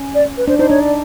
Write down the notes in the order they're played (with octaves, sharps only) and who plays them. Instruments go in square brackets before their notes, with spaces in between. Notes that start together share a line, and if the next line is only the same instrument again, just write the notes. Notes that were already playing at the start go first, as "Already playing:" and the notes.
Already playing: [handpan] C#4
[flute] D5
B4
[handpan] D4 [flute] C5
[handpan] D#4 [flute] C5
[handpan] D4 [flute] C#5
[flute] D5